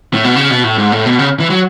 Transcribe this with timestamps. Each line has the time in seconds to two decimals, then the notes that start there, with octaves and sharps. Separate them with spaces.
0.14 A2
0.24 B2
0.36 C#3
0.50 B2
0.64 A2
0.78 G#2
0.92 A2
1.06 B2
1.19 C#3
1.40 E3
1.50 F#3